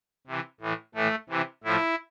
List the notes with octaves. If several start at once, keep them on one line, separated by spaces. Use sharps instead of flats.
C3 E3
A2 E3
A2 E3 A3
C3 E3
A2 F3 E4